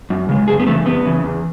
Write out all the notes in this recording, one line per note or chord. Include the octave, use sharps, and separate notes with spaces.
F#2
C#3 G#3
F#2 G#4
B3
C#3 E3 A3
F#2 B3
C#3 E3
E2